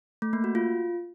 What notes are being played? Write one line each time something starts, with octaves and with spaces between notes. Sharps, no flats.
A3
A#3
F#4
F4